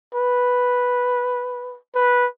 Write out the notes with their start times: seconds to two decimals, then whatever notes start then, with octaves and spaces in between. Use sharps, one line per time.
0.14 B4
1.95 B4